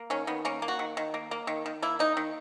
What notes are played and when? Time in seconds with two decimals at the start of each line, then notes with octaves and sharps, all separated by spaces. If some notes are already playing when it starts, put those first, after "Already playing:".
Already playing: A#3
0.10 D#3 C#4
0.27 D#3 B3
0.45 A#3 C#4
0.62 A#3
0.68 F#4
0.79 D#3
0.97 D#3
1.14 A#3
1.31 A#3
1.47 D#3
1.66 D#3
1.82 A#3 E4
1.99 A#3 D#4
2.17 D#3